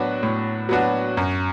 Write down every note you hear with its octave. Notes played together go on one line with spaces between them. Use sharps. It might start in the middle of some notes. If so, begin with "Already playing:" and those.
Already playing: A2 F#3 B3 D4 F#4
A2
F#3 B3 D4 F#4
F#2